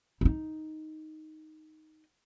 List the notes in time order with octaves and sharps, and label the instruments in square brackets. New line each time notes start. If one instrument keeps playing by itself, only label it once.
[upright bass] D#4 E4